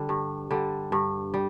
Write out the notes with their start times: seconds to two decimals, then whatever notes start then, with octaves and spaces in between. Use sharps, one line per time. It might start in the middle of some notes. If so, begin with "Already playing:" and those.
Already playing: D3 G3
0.09 G2
0.51 D3 G3
0.92 G2
1.34 G3